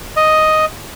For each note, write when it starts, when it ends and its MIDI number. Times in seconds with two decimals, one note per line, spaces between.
0.16 0.65 75